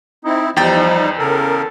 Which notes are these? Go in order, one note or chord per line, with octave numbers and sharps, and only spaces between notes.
C4 D#4 E4
E2 F3 G3 D#4 G5 A6
C#3 A4 A#4